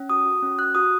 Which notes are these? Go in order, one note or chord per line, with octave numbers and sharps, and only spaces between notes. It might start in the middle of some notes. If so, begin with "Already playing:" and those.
Already playing: C#4
F#4 D#6
F#4
C#4
F#4 F#6
F#4 D#6